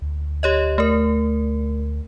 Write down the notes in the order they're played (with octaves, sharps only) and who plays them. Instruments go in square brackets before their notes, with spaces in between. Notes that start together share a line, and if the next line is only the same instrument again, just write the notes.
[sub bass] D2
[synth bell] G4 C#5 D#5
A3 A#4